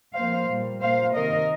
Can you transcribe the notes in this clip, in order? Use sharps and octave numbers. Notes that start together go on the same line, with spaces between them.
F2 F3 A#3 C5 F5
A#2 G3 A#3
A#2 A#3 C5 F5
C3 D#3 A#3 A#4 D#5